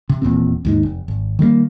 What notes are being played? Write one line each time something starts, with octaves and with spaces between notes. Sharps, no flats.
C3
D#1 E2 A#2 C4
D#2 G#2 D#3
F1
G#1
D#3 G3 G#3 A#3